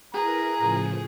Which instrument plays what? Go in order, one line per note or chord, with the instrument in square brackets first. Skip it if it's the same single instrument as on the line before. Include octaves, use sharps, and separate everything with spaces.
[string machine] E4 A#4 B4 [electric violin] G#4 [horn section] A#5
[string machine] A2 C#3 F3